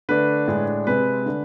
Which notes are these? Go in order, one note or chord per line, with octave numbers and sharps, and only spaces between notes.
D3 A3 D4 B4
A2 G#3 D4
C3 G#3 C4 B4
D3 A3 D4